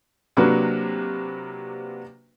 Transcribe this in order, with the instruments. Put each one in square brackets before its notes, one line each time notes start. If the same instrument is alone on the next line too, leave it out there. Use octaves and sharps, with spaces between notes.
[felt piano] C3 F#3 A#3 D4 F#4 B4